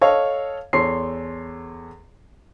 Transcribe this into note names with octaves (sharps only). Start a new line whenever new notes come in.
A4 C#5 D#5 F5
E2 A4 C#5 C6 C7